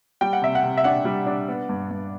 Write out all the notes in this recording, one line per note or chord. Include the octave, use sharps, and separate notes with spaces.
G3 G5
F#5
C3 E5
F#5
C3
E5
D4 F#5
G3
D4
B3
G2
G2